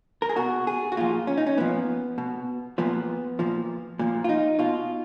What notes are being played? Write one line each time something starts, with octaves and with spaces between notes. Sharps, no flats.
A#4
G#4
B2 F#4
G#4
F#4
A#2 F3 F4
C#4
D#4
C#4
A#2 F3 B3
B2
A#2 F3 B3
A#2 F3
A#2 F3
F4
D#4
B2 F4